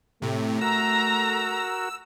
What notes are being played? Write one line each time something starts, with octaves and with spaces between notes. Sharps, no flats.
A2 C3 A3
F#4 A#4 A#5 E6